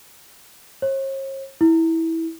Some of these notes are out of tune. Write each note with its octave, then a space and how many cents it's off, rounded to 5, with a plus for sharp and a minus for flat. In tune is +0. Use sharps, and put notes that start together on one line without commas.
C#5 -45
E4 -15